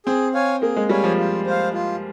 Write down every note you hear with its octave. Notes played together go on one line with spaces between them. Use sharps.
C4 G#4
C#5 F5 G#5
A#3 G#4
G#3
G3 C#5 F5 G#5
F3
F4
C5 F5
F4